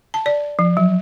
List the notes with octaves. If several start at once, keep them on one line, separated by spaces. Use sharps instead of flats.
A5
D5
F3
F#3